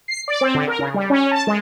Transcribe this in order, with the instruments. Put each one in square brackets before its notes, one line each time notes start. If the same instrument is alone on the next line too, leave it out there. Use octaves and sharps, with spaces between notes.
[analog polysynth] C7
D5
C4
D3
A#4
C#3
G3
C#4
A5
G#3